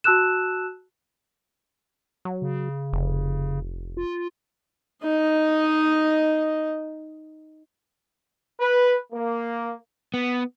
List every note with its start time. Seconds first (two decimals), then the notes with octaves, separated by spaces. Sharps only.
0.04 F#4 A5 E6 F#6 E7
2.25 F#3
2.42 C#3
2.92 F1
3.97 F4
5.03 D#4 D#5
8.59 B4
9.12 A#3
10.14 B3